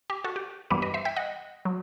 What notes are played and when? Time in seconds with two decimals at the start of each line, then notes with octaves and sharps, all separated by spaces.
0.10 G4
0.24 F#4 A4
0.36 G4
0.70 G2 E3 G3 B3 G4 B4
0.82 B4 D#5
0.94 C5 E5
1.05 E5 G5
1.16 D#5 F#5
1.65 F#3